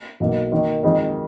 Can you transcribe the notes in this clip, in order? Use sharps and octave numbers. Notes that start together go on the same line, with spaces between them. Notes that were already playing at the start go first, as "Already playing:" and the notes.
B1 B2 A#3 D#4
D#3 A#3 D#4
F2 D#3 G#3 D#4 A#4